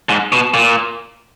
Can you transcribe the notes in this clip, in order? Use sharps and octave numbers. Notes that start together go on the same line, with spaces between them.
G#2
B2
A#2